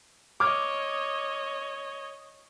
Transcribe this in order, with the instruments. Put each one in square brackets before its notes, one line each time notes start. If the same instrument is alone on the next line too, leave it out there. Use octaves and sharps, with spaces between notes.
[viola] C#5 D#5 [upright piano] D6 F6 G#6